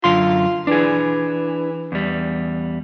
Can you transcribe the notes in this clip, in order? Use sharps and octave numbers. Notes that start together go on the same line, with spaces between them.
F#2 D3 F4 C6
E3 D4 G#4
E2 G3